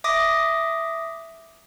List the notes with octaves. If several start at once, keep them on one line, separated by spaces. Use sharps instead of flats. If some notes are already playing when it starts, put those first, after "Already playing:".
E5 D6 D#6 A#6